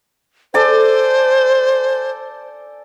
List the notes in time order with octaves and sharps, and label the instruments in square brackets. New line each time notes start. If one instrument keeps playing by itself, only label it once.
[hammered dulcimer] A4 D5 G#5 [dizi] C5